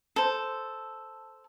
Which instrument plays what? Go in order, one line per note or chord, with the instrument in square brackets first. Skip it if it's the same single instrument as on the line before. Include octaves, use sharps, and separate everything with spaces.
[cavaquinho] A4 C5